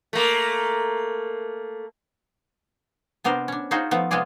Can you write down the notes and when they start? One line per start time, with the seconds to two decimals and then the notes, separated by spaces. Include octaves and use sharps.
0.13 A3 A#3
3.24 C3 B3 D4 A#4 C5
3.48 C#4 D4
3.71 D#4 F4 F#4 G#4 C5
3.91 F3 A3 B3
4.11 C3 G#3 B3 F4 G#4 D5